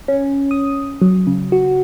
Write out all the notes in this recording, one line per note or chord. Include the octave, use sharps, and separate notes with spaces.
C#4
D#6
F#3
C#3
F#4